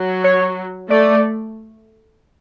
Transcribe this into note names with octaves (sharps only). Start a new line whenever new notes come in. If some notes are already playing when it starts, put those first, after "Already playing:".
Already playing: F#3
C#5
A3 D5